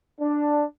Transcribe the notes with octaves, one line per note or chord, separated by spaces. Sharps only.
D4